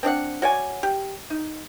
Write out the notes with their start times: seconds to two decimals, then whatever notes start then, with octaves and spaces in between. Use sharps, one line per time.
0.03 C4 D4 D5 F#5
0.42 F#4 C#5 D5 G#5
0.83 G4
1.30 D#4